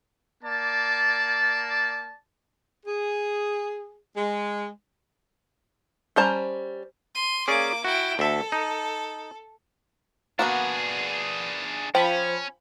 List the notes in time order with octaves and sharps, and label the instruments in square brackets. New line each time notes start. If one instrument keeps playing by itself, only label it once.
[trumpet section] A#3 D5 A5
[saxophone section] G#4
G#3
[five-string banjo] G3 C#4 C5 A5 A#5
[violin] C6 D#7
[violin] A#3 D6 [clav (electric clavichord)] C#4 G#4 D5
[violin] E4 G5 [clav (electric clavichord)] F#4
[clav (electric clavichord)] D2 E5 [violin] A4
[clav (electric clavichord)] D#4
[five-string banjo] A#3 B3 F#4 [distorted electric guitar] D4 G#4
[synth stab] F3 B5 [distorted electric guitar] C#4 [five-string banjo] G5